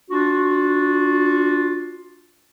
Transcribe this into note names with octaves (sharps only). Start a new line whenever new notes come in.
D4 F4 F#4